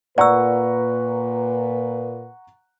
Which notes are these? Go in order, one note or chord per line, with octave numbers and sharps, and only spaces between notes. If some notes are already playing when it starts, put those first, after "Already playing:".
A#2 B4 D5 F#5 A#5 C#6 E6